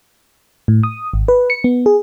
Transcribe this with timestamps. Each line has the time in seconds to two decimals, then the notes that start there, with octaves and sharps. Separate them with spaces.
0.68 A2
0.83 D#6
1.13 G#1
1.28 B4
1.50 C#7
1.64 B3
1.86 G#4